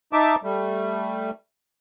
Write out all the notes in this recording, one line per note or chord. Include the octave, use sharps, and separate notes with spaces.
D#4 E5 A5 D6
G3 A3